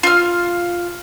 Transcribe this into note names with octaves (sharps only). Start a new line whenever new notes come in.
F4 F6